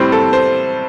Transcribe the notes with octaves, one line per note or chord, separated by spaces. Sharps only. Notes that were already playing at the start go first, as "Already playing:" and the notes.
Already playing: A2 G3 C4 C5
A4
C5